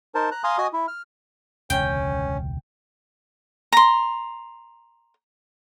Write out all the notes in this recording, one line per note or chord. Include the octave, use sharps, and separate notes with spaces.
D#4 A#4 C5 A5
A#5 F#6
F5 G#5 A#5 C6 D#6
F#4 D#5 G#5 D#6
E4
F6
E1 C#2 D3 C#4 G5
A#5 C6